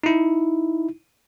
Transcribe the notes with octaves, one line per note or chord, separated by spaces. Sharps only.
D#4 E4